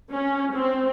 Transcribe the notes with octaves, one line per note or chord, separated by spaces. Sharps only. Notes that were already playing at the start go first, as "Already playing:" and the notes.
C#4
C4